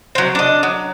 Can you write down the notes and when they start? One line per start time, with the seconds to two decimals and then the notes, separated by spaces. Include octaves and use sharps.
0.15 F#3 C4
0.35 D4 D#5
0.63 F#3